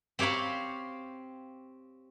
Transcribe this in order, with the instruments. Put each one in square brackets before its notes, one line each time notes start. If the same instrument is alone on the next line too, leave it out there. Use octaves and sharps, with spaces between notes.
[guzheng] C4 G4 C#5 F5 B5